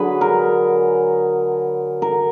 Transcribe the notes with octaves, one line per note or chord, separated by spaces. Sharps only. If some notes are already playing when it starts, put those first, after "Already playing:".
Already playing: D3 F#3 G#4 B4
A#4
A#4